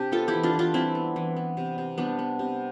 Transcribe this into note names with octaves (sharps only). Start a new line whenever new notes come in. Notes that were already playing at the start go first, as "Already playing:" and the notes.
Already playing: C3 D4 G4
B3 F4 A4
E4 G4
E3
D4 F4
E3
D4 F4
G3 C4 E4
B3
E3
B3
C3
C3
G3 B3 D4
B3
C3